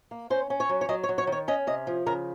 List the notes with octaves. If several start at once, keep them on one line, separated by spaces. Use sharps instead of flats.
A#3
C#4 C5
C#4
C#5
F#3
C#5
F#3 D#5
C#5
F#3
C#5
D#3
C#5
C#4 D#5
C3 D#5
F3
C#3 A#4